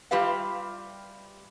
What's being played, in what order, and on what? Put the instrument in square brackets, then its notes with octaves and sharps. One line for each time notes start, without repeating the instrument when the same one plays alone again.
[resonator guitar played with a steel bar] G3 F4 G4 B4 E5 F5